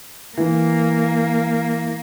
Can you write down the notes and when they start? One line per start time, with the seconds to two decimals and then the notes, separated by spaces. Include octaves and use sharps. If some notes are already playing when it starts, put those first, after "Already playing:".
0.37 E3 A#3